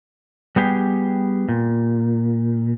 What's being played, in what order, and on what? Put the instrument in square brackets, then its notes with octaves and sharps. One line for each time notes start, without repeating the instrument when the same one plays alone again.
[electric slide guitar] G3 B3 G4 G#4
A#2